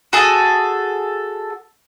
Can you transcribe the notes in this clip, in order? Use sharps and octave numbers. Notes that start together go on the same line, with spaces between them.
F#4 G#4 A4